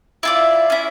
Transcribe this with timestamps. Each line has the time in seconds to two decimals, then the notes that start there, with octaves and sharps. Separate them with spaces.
0.23 E4 F4 D5
0.70 C#4 E4